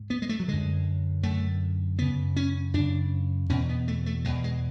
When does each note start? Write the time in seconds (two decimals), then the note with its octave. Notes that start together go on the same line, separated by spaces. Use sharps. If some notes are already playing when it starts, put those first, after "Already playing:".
Already playing: G#2
0.10 B3
0.22 G#3
0.29 A3
0.40 F#3
0.48 F#2 D3 G#3
1.23 F#2 D3 A3
1.99 F#2 C#3 B3
2.36 C#4
2.74 F#2 C#3 D4
3.50 E2 B2 C#4
3.69 B3
3.88 A3
4.06 A3
4.25 E2 B2 G#3
4.44 G#3